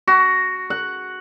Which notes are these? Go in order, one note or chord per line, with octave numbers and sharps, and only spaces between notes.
F#4
F#5